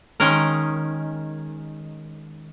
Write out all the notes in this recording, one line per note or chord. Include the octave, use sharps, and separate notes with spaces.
D#3 G#3 C#4 A#4